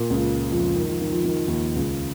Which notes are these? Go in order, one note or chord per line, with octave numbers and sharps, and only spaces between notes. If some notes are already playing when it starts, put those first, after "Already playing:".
Already playing: A#2
C#2 C#3
F2 F3
D#3
F3
D#3
F3
D#3
F3
D#2 D#3
C#2 C#3